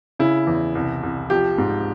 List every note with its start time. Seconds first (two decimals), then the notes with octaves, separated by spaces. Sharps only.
0.19 C#3 E4
0.47 E2
0.75 C2
1.03 C2
1.30 F3 G4
1.58 G#2